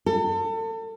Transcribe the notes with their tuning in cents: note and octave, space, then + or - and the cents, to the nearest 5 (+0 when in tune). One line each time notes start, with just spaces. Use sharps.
A4 +35